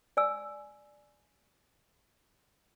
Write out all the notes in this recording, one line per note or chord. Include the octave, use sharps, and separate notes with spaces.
D5 G#5 E6